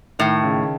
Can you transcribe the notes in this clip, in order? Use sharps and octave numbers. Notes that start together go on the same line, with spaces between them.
A2 D#3
C#3